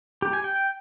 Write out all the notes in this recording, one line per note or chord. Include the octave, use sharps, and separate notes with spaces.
G4
G#5
G5